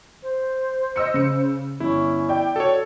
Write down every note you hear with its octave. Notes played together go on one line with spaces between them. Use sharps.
C5
D#5 E6 C#7
C#3 C#7
G1 C#4 E4
D5 G5
F#4 A4 C#5